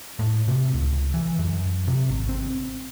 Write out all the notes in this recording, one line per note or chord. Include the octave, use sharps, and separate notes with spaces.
A2
C3
C#2
E3
F#2
C3
G#1
C4